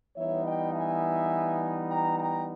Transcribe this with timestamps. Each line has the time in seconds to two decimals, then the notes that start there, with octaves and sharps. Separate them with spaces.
0.15 E3 G3 B3 D#4 C#5 E5
0.45 D#5 G5
0.73 E5 G#5
1.88 G5 A#5
2.17 G5 A#5